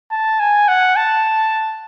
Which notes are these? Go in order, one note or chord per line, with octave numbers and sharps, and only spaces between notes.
A5
G#5
F#5
A5